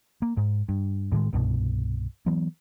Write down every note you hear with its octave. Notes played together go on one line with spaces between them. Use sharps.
A#3
G#2
G2
A2 D#3 G3 G#3
C2 G2 B2
E3 F#3 B3